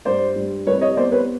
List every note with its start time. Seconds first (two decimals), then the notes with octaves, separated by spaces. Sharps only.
0.05 G2 C5 D5
0.36 G2
0.66 C2 B4 C#5
0.81 C#5 D#5
0.97 B3 C5 D5
1.12 B4 C#5